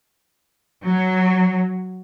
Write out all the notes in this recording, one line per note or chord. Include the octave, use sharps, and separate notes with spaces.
F#3